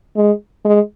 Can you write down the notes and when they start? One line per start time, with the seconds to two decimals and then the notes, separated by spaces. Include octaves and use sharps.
0.17 G#3
0.65 G#3